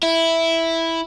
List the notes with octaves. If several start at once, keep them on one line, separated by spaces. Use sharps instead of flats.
E4